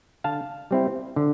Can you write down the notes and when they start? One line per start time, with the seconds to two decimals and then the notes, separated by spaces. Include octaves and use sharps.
0.24 D3 F5 A5
0.71 G3 C4 E4
1.16 D3